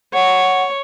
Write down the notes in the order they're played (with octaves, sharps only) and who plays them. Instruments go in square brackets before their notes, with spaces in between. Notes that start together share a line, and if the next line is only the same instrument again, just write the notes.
[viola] C#5 [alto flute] F#5